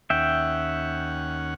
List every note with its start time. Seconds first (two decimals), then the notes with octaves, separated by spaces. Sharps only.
0.10 D#2 C#4 E5 F#5 G5